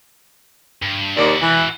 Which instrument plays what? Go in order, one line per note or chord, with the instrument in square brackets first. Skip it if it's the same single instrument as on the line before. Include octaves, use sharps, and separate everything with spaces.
[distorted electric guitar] G2
[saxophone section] D#2 D5 [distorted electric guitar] E4 F#4
[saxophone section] E3